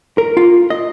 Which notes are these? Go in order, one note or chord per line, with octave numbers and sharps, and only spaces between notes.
A#4
F4
D#5